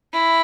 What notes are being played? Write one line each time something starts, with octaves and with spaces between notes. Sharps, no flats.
E4